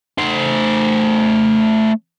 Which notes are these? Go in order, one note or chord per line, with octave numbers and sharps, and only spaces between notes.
A3 C5